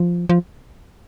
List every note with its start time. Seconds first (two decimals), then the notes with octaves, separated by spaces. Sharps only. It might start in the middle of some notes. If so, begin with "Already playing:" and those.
Already playing: F3
0.29 F3